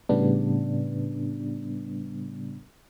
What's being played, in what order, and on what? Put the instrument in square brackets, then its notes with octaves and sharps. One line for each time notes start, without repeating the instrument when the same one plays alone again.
[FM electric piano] A2 C#3 G3 B3 D4